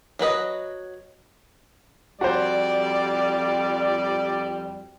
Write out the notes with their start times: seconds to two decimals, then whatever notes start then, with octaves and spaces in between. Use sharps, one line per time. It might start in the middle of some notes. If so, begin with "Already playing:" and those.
0.19 F#3 F#4 B4 D#5
2.21 F2 G3 F#4 C5 D5